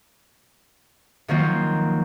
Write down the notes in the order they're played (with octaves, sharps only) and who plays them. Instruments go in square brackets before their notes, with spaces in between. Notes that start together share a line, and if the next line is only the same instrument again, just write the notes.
[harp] D#3 F3 F#3 A#3 C4 F4